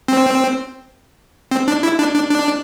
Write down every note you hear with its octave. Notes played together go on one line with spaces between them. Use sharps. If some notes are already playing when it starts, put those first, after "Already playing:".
C4
C4
D4
E4
D4
D4
D4